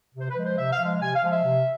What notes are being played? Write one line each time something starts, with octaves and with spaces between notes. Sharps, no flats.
C3 C5
B4
F3 G#3
C5
C3 E5
F5
F3 G#3
C3 G#5
F5
F3 G#3
E5
C3